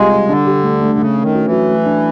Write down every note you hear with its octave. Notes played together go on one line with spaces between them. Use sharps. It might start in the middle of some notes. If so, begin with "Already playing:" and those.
Already playing: C3 G3 G#3 C4 F4
G3
D3 D4
G4
A3
A3
C#3 A3
C#4
D#3
F#4
E3
F#3
A3
D4